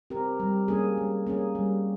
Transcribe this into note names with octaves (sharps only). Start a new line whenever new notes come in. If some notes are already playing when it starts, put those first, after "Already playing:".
C4 G4 A#4
G3
A#3 C#4 G#4
G3
A#3 C#4 G#4
G3